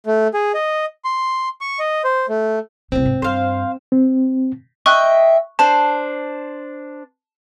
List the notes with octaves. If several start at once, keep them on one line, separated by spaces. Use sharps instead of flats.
A3
G#4
D#5
C6
C#6
D#5
C5
A3
C2 A2 C4
G#2
G2 C5 F5
C4
D#5 E5 G5 C#6 F#6
D4 C5 A5